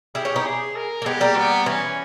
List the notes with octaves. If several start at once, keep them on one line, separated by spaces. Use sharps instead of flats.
E4 G4 G#4
C#4 E4
B3 D#4
G#4
A#4
A#3
G#3 B3 G4
G3 A#3
B3
E3 C#4